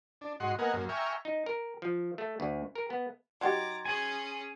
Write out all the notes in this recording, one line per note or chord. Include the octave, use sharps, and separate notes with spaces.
D4
G#2 F#4 D#5 F#5 C6
A#3 B3 A#4 D#5 F#5 G#5
F#2 A#3
E5 G5 G#5 A#5 C#6 F6
D#4
A#4
F3
A3
D2
A#4
B3
F#3 D#4 G4 A#5 C6 D6 G#6 A6
C#4 G#4 G#5